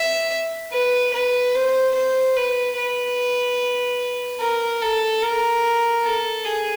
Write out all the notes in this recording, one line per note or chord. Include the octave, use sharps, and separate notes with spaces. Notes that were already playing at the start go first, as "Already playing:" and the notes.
Already playing: E5
B4
B4
C5
C5
B4
B4
A#4
A4
A#4
A4
G#4